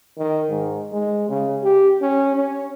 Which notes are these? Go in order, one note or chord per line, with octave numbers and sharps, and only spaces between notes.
D#3
G#2
G#3
C#3
G4
C#4
C#4